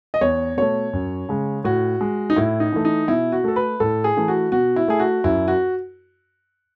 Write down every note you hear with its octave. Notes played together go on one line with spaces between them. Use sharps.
D#5
E2 C#5
B2 A3 C#5
F#2
C#3 G#3
A2 F#4
G#3
D#4
A2 E4
D#4
E3 A3
D#4
B2 E4
F#4
A3 A4
B4
A2 A4
G#4
E3 A3
F#4
B2 F#4
E4
A3 G#4
F#4
F#2 E4
F#4